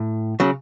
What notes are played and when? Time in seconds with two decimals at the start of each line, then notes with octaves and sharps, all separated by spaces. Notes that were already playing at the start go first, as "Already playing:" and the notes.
Already playing: A2
0.40 C#3 F#3